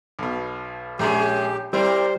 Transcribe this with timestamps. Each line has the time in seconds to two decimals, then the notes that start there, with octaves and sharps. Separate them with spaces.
0.19 B1 B2
0.99 A#1 G#3 C#4 G4 G#4 A#5 C6
1.73 G3 C4 E4 A#4 C5 D5